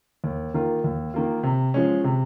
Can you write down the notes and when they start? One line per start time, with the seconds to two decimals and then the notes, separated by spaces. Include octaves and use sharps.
0.24 D#2
0.54 D#3 A#3 F4
0.84 D#2
1.14 D#3 A#3 F4
1.43 C3
1.74 F3 G#3 C#4
2.04 C3